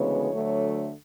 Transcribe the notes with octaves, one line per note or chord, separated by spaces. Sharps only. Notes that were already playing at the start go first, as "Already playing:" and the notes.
Already playing: D2 C#3 E3 G#3 B3 C#5
D2 D3 F#3 A3